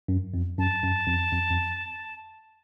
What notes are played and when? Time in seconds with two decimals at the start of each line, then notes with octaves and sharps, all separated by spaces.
0.08 F#2
0.34 F2
0.58 F#2 A5
0.83 F#2
1.07 F2
1.32 F2
1.50 F2